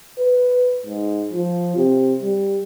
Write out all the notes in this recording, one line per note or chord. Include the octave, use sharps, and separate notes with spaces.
B4
G#2
F3
C3
G3